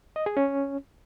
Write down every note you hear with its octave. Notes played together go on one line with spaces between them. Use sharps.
D#5
G#4
C#4